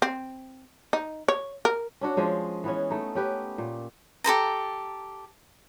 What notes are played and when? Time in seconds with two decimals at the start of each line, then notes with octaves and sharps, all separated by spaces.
0.02 C4
0.93 D#4
1.28 C#5
1.65 A#4
2.01 C#4 D4 F#4 F#5
2.17 F3 G#3 C#4
2.64 E3 B3 C#4
2.90 A3 D#4
3.15 C#4 G4 B4
3.58 A#2
4.24 G4 A4 C5 A#5